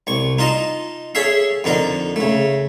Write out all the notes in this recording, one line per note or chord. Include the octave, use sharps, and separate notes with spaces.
C2 C#6
D#4 F4 D#5 A5
G#4 A4 C#5 E5 F5
F2 D3 D#4 A#4
C#3 A3